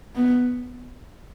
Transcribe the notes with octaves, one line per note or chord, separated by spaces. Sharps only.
B3